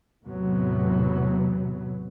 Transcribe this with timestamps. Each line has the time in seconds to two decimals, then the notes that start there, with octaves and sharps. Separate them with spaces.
0.24 E2 A2 C3 F#3 B3